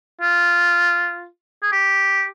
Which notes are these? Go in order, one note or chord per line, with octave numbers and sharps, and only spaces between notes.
F4
G#4
G4